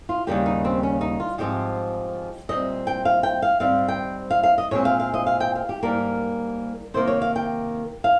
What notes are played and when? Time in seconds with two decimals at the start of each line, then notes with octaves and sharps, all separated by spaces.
0.09 F4
0.27 D#2 C#3 G3 A#3 G4
0.46 D#4
0.65 C4
0.83 C#4
1.01 D#4
1.20 F4
1.38 G#2 F3 G#3 C4 G4
2.49 A#2 G3 C4 D#5
2.87 G5
3.05 F5
3.23 G5
3.42 F5
3.60 G#2 G3 C4 F5
3.88 G5
4.31 F5
4.43 F5
4.58 D#5
4.71 A#2 G#3 C4 C#5
4.85 F5
5.00 F5
5.14 D#5
5.27 F5
5.40 G5
5.55 F5
5.69 G4
5.83 G#2 G3 A#3 A#4
6.94 C3 D#3 A#3 C5
7.07 C#5
7.22 F5
7.36 G5
8.04 F5